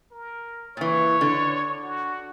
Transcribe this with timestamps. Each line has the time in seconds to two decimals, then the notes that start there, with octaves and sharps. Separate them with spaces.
0.11 A#4
0.77 A#2 E3 C#5
1.21 D3
1.84 F#4